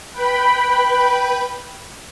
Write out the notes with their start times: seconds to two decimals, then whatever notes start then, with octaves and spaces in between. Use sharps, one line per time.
0.12 B4 G5 B5